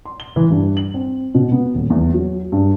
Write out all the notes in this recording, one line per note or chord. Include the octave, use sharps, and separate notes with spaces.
C6
G7
E3
G2
F#7
C4
B2
B3
D#1
E2
F#3
G2